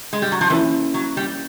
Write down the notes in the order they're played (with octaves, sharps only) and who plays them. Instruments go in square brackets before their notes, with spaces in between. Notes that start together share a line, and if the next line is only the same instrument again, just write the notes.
[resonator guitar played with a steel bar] G#3
G3
F#3
F3
[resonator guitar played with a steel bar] E3 [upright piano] A#3 C#4 E4
[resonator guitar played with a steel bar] F#3
G3